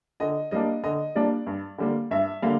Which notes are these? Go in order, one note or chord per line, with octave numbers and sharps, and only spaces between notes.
D3 D#5
G3 A#3 D4 D#5
D3 D#5
G3 A#3 D4 D5
G2
D3 G3 A#3
G2 E5
D3 G3 A#3 F5